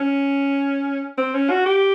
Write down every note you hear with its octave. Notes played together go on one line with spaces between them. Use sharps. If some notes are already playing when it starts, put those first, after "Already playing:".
Already playing: C#4
C4
C#4
F#4
G4